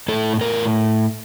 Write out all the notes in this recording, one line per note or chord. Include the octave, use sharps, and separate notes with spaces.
A2 A4
A2 A#4